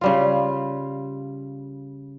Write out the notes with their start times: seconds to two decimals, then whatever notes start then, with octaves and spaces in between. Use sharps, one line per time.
0.01 C#3 G3 F4